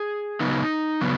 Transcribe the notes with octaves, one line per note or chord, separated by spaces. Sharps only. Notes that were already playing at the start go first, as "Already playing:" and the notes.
Already playing: G#4
C#3 F#3 B3 D#4
C#3 F#3 B3